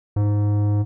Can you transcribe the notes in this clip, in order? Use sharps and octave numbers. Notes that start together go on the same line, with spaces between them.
G#2